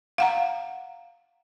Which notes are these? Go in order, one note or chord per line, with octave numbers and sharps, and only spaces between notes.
F5 F#5 A#5